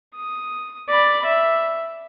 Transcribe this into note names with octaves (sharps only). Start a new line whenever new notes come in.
D#6
D5 B5
E5